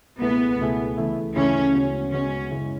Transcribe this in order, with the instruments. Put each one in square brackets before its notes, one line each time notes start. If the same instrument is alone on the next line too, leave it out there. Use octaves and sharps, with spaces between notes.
[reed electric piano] C#2 B2 A3 E4 G#4 [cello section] B3
[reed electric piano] C#2 B2 A3 E4 G#4
D2 C#3 E3 A3 E4
[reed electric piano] D2 C#3 E3 A3 E4 [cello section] C#4
[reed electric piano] D2 C#3 G#3 B3 F#4
[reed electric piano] D2 C#3 G#3 B3 F#4 [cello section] C#4
[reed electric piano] F#2 C#3 G#3 C#4 E4